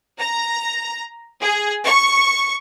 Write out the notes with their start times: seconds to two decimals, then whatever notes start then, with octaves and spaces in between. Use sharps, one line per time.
0.20 A#5
1.42 G#4
1.85 C#6